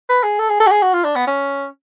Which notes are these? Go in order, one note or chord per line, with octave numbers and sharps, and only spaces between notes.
B4
G#4
A4
G#4
A4
F#4
G#4
F#4
F4
D4
B3
C#4